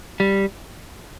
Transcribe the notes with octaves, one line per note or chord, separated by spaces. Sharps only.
G3